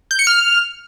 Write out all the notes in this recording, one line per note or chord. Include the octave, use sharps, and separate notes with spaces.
G6
C#7
F6